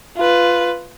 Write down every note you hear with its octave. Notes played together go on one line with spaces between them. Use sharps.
F4 B4